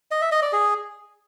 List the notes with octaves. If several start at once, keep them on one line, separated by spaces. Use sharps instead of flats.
D#5
E5
D#5
D5
G#4